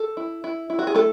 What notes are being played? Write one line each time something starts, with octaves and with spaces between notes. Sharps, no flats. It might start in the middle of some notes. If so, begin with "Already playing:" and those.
Already playing: A4
E4
E4
E4
F#4
G#4
A3 A4